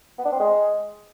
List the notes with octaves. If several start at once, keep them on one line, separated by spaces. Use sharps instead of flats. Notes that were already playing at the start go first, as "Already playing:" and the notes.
B3
D4
C4
G#3